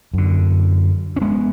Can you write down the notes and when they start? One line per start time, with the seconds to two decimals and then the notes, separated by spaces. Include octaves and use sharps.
0.14 F#2 D3
1.16 C#4
1.21 G#3 B3